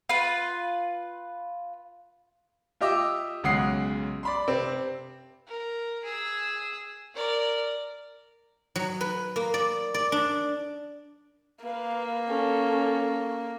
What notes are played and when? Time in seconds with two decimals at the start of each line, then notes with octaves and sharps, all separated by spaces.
0.09 F4 B4
2.81 F4 G4 D#5 E5 D6 E6
3.43 B1 C#3 G#3 F#5 D#6 C7
4.23 D5 B5 C6
4.48 C3 C4
5.48 A#4
6.04 G#4 E6
7.15 A#4 D5
8.75 F#3
9.01 B4
9.36 A#3
9.54 D5
9.94 D5
10.12 D4
11.64 A#3 B4 F5
12.27 C#4 A4